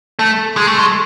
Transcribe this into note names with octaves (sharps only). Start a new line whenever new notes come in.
A3
G#3
A3
G#3